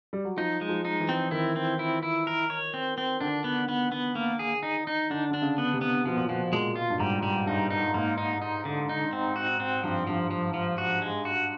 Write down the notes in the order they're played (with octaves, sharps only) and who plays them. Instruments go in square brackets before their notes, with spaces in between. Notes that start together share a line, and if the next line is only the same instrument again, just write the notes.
[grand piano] G3
F#3
[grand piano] F3 [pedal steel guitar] D#4
[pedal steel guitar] G#3
[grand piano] F3
[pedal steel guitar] D#4
[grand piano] E3
[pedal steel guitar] C4
[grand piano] D#3 [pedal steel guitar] E4
[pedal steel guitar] C4
E4
E4
A#4
C#5
C4
C4
[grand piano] D3 [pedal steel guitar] D4
[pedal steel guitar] B3
B3
B3
A#3
G#4
D#4
D#4
[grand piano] D3 [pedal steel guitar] D4
[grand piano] D3 [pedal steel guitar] D4
[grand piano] C#3
[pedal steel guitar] B3
[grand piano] C3
[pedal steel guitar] B3
[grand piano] B2 [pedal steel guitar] F3
[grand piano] A#2
[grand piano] B2 [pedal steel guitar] F3
[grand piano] A#2 [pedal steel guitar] G#3
[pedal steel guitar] F4
[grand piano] G2
[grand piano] G#2 [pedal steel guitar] G3
[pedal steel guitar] G3
[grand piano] G2 [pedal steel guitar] D#4
[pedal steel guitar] D#4
[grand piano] G#2 [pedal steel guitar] A#3
[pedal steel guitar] D#4
D#4
D3
D#4
C4
F#4
C4
[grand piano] G2 [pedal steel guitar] F3
[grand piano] G2 [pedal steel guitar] F3
[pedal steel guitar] F3
F3
F#4
G#3
F#4